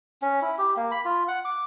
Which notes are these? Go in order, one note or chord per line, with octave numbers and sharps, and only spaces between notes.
C#4
E4
G4
A#3
B5
F4
F#5
D6